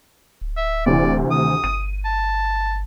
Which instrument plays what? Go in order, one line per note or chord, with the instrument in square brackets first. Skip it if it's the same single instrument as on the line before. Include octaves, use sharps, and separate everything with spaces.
[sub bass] D1
[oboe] E5
[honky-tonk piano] D2 C3 E3 [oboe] D5
[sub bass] D#3 [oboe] D#6
[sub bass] G1 [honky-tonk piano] D#7
[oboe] A5